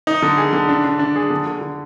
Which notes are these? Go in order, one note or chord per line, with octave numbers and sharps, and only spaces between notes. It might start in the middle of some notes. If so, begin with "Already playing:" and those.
D#4
D3
G#4
D3
D4
D4
D4
G#4
D3
D3
D3